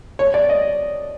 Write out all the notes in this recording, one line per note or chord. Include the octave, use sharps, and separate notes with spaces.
C#5
D5
D#5